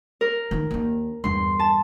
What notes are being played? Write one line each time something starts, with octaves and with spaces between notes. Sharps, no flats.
A#4
D#3 D#4
D#2 D4
E2 G2 C6
A5